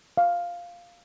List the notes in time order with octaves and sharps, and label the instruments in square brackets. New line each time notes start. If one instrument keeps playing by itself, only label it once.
[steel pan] F5